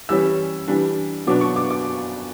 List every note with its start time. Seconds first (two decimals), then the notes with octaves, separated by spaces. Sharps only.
0.09 E3 G3 C#4 E6
0.68 E3 G3 D4
1.27 B2 F#3 B3 D4 D6
1.41 C#6
1.56 D6
1.70 D6